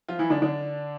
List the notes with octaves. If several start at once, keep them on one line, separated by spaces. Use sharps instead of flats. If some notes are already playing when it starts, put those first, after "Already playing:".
F3 F4
E3 E4
D3 D4
D3 D4